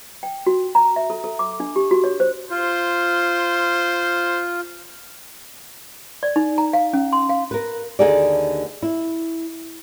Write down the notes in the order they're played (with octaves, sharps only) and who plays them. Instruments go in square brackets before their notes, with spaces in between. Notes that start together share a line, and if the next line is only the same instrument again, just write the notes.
[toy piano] G5
F#4
A#5
E5
A4
A4
D6
D4
G4
F#4
C#5
C5
[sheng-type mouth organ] F4 [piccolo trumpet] C5
[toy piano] D5
D#4
A#5
F5
C#4
C6
F5
[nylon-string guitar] A#4 B4
D#2 D3 D#4 G#4 A4 D5
E4